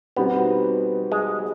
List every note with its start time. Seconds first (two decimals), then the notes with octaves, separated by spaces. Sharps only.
0.16 B2 G3 B3 C4 D#4
1.12 G#3